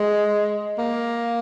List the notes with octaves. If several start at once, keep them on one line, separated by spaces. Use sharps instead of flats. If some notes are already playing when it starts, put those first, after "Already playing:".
Already playing: G#3
A#3